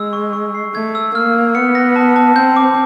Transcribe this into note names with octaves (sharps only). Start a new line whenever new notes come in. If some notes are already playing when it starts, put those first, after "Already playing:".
Already playing: G#3 E6
C#6
C#6
C7
A3 G#6
E6
A#3 F6
F6
B3 C#7
A#6
A5
A5
C4 G6
D6